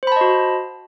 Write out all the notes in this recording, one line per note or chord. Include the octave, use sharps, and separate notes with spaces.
F#4 C5 D#5 A5 B5